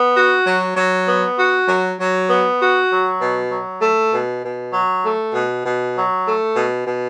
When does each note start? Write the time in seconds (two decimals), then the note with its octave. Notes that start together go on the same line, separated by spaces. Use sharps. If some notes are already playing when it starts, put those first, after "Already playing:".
Already playing: B3
0.15 F#4
0.45 F#3
0.76 F#3
1.07 B3
1.37 F#4
1.67 F#3
1.98 F#3
2.29 B3
2.59 F#4
2.90 F#3
3.21 B2
3.50 F#3
3.81 A3
4.12 B2
4.42 B2
4.72 F#3
5.04 A3
5.34 B2
5.65 B2
5.95 F#3
6.26 A3
6.56 B2
6.86 B2